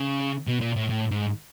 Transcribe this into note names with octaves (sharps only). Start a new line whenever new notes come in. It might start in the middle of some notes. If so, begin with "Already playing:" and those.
Already playing: C#3
B2
A#2
A2
A2
G#2